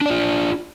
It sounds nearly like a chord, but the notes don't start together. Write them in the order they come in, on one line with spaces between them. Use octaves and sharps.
D4 D5 F4